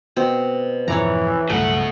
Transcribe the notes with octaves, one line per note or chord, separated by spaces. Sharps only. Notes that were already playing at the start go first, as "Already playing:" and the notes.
B2 C4
F2 G#2 B2 E3 C#5 D5 A#5
C#2 G2 B2 F#3 A3 F#5